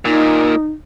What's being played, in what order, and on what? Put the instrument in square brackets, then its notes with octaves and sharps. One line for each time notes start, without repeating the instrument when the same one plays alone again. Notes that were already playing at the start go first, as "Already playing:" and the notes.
[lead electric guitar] A#2 [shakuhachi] D#4